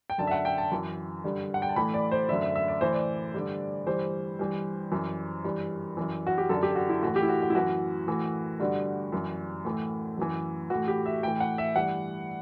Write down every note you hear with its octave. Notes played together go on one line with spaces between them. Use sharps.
G5
F#2 D3 A5
E5
F#5
G5
A5
F#2 E3
G2 D3
F#5
G5
A5
A2 E3 B5
D5
C5
F#2 D3 E5
E5
E5
D5
A2 E3 C5
D5
G2 D3
G2 E3 C5
G2 E3
F#2 E3
G2 E3
F#2 E3
F#4
G4
F#2 D3 A4
G4
F#4
E4
A2 E3 F#4
G4
E4
F#4
F#4
E4
F#2 E3 F#4
A2 E3
G2 D3 F#4
F#2 E3
A2 E3
F#2 E3
A2 E3 F#4
G4
E5
A2 E3 G5
F#5
E5
G2 E3 F#5